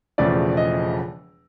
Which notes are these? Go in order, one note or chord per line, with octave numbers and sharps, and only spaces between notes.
E1 E2 C#3 F3 A3 D5
D#5